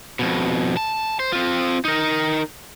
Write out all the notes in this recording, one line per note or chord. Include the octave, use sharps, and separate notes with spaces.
F2 B2
A5
C5
C4 F4
D#4 A#4